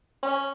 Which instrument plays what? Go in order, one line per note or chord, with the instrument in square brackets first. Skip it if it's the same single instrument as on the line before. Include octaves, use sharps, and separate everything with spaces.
[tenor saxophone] C#4